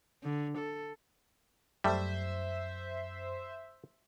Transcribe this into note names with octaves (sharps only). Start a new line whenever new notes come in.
D3
A4
F#2 G3 A3 C5 E5